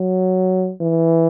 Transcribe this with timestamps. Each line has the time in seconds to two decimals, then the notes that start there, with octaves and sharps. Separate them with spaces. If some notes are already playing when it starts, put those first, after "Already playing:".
Already playing: F#3
0.81 E3